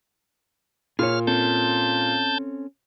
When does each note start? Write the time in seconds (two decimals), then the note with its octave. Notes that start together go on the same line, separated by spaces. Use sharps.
0.99 A#2 G#4 C#5 F6
1.27 C4 C#4 A4 A5 G6